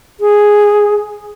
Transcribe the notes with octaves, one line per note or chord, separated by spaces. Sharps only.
G#4